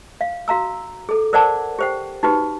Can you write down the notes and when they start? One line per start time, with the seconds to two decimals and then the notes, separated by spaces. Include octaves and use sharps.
0.21 F5
0.48 F#4 F5 A#5 E6
1.09 G#4 A4
1.33 A#4 C5 D5 F#5 A5 D6
1.79 G4 C5 G5
2.23 D#4 F#4 G4 B4